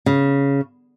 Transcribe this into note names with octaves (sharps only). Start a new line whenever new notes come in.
C#3